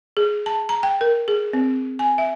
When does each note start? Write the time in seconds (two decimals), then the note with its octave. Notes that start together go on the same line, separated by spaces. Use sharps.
0.17 G#4
0.46 A5
0.69 A#5
0.83 G5
1.01 A#4
1.28 G#4
1.53 C4
1.99 G#5
2.18 E5